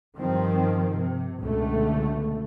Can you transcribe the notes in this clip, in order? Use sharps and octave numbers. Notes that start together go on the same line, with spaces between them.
G2 D#3 F3 C4
C3
C#2 B2 D3 A3